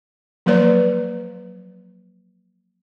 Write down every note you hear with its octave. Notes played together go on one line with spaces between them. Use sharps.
F3 F#3 A#3 B4 D5 A#5